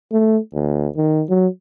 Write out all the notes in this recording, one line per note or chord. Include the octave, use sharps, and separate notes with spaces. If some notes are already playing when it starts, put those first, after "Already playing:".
A3
D2
D#3
F#3